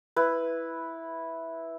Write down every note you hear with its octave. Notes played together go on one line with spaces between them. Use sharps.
E4 B4